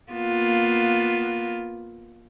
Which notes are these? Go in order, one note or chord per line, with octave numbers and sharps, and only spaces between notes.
A#3 B3 F4